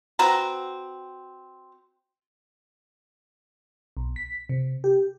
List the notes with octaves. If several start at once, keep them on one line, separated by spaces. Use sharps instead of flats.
C4 F#4 B4 A#5
B1
B6
C3
G4